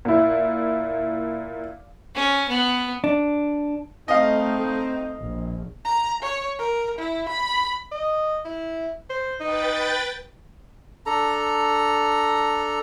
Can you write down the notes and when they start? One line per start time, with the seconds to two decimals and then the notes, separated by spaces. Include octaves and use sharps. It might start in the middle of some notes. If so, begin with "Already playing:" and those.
0.05 A#2 E4
2.15 C#4
2.48 B3
3.04 D4
4.08 A3 C4 D#4 D#5 F5
5.19 A#1
5.85 A#5
6.22 C#5
6.59 A#4
6.98 E4
7.29 B5
7.91 D#5
8.45 E4
9.10 C5
9.40 D#4 B4 G5 A6
11.06 D4 A4 A#5